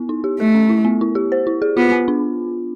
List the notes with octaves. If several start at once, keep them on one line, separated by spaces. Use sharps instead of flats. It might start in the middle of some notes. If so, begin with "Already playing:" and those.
Already playing: B3 E4
D#4
G4
A3 A4
C#4
E4
B3
E4
G4
C5
E4
G#4
B3 F4
B3
D4